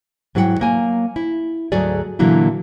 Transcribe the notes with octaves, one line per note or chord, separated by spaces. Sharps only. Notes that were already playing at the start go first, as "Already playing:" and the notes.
G#2 F#3 E4 G4 F#5 G5
F#3 A#3 G#5
E4
D2 G#2 F#3 A3 G#4 D5
A#2 D3 E3 F#3 A#3 E4